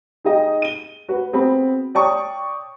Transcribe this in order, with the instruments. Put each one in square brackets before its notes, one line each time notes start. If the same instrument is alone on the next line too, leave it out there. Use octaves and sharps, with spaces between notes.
[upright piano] D#4 G#4 D#5 G5
D#7 G7
F#4 B4
B3 C4 F#4 G#4 B5
C#5 D5 G5 A5 C#6 D#6